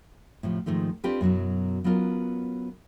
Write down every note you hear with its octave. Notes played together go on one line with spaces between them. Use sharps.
A2 C3 F3
G#2 D#3 F3 A3 D#4
C4 D4 F4 G4 A4 B4
F#2 B2 F#3 E4
F#3 B3 C#4 F4 A#4